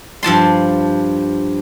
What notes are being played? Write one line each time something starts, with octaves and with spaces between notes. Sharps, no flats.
G2 F3 A5 C6